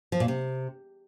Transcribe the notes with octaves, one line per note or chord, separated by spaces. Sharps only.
F3
A#2
C3